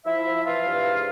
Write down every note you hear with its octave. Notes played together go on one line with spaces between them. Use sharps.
F3 E4 E5
F3
E3 F4 F5
G2
G#2